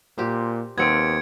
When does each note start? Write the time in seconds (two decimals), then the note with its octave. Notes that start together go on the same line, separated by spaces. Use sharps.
0.18 A#2 G4 C5
0.78 D#2 B3 C4 G#6 C#7 D7